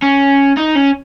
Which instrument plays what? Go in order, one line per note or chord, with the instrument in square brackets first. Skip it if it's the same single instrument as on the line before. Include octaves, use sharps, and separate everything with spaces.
[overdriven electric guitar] C#4
D#4
C#4